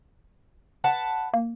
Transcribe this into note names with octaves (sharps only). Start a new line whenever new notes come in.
B4 F#5 A5
A#3